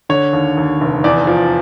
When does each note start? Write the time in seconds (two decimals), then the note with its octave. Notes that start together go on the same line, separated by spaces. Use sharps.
0.09 D3 C#5
0.33 D#2
0.57 D#2
0.81 F1
1.04 E2 D5
1.27 F3